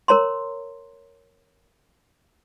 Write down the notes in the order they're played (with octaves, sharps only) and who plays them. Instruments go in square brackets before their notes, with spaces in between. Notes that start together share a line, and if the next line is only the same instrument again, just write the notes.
[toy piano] A#4 C#5 A#5 C6